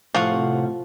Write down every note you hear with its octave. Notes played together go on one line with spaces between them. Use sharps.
A2 C3 F3 F5 F#5 C#6